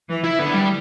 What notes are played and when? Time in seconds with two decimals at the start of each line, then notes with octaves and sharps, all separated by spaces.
0.10 E3
0.24 E4
0.39 D3 B3
0.54 G3